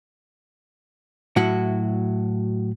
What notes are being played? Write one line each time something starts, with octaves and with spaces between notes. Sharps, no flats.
A2 F#3 E4 F#4